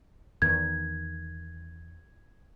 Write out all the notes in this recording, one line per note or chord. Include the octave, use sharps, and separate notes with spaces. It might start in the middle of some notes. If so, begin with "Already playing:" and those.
E2 D#3 G#6